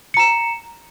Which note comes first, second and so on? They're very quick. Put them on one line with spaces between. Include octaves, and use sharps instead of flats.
C#7 A#5 E7